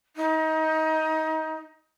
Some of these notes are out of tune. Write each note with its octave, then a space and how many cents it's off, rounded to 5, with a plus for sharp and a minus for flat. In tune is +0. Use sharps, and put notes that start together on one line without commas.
D#4 +25